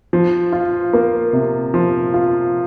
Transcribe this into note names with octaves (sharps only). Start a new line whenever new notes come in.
F3
F4
A#3
C3
F3
F4